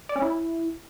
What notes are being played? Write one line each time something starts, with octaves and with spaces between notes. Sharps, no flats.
D5
C#4
E4